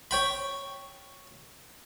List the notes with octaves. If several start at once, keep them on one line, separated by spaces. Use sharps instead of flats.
C#5 G5 B5